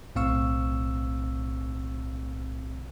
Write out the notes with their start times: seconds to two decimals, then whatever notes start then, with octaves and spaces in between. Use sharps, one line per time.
0.15 B1 A2 C4 F5 C#6 E6